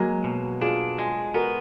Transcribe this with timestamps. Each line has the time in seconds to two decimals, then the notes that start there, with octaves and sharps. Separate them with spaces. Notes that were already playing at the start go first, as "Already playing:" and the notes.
Already playing: F#3 G#3 A#3
0.24 B2
0.61 D4 F4 G#4
0.98 G#3
1.34 B3 F#4 A#4